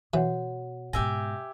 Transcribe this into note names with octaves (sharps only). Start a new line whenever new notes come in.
B2 E3 F#4 C#5 F#5
G#2 B2 G4 E5 G#5 A#6